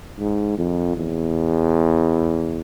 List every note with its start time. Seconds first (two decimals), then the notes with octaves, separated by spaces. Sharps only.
0.19 G#2
0.57 F2
0.97 E2